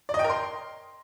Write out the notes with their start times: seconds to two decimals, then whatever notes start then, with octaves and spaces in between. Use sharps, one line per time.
0.09 D5
0.14 D#5
0.19 G5
0.24 A#4
0.30 C6